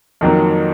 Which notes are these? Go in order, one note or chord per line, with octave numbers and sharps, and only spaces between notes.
F2 D#3 F#3 A#3